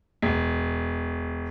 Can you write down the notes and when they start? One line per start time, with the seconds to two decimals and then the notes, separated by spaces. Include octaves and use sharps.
0.22 E1